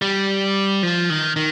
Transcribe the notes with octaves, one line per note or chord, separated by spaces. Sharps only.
G3
F3
D#3
D#3